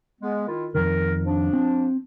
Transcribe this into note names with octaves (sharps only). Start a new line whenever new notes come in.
G#3 B3
D#3 E4 F4
F2 D#3 A#4
F3 D4
C4